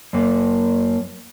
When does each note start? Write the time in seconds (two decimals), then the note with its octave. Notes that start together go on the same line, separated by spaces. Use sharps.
0.13 F#2 A#3